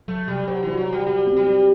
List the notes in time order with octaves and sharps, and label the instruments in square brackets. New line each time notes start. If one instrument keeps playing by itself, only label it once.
[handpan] F#3 [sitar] A3
[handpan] C3 [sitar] G3
[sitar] F#3 [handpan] C5
[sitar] E3 [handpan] F#4
[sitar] F#3
[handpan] F#4
[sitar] G3
[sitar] G3 [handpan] G4
[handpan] C4
[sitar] G3
[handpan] G4